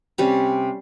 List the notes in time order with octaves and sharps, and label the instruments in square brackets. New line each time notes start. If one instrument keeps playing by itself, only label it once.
[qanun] C3 G3 C#4